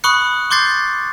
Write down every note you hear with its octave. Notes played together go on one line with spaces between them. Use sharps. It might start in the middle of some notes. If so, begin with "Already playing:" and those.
B5 C#6 D#6 F#6 C#7
C6 D6 G6 A6 C7